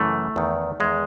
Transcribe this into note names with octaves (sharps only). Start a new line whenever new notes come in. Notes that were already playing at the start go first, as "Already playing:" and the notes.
Already playing: F#2 C#3 E3 A3
E2 D#3
E2 D#3 G#3